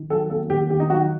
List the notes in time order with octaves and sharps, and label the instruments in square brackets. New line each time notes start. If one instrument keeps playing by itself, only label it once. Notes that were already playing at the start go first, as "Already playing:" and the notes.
Already playing: [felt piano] D#3
[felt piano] F#3 [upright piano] A4
[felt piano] A#3 [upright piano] A4
[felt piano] D#2 [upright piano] G4
[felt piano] D#3 [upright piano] G4
[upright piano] D#4
[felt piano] F#3 [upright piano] F#4